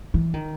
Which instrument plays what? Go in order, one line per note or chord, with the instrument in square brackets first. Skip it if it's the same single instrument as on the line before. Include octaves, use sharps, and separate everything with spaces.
[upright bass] E3
D#3